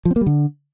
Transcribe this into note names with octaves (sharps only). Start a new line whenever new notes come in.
F3
C4
A#3
G3
D3